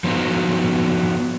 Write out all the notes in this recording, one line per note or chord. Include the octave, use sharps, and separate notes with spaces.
F3 B3 C#4 D#4 F#4